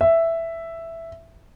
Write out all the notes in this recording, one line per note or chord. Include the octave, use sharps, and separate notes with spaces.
E5